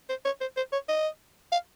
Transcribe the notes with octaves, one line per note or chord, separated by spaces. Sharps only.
C5
C#5
C5
C5
C#5
D#5
F5